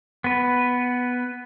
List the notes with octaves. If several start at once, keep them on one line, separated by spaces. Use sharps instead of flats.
B3 B4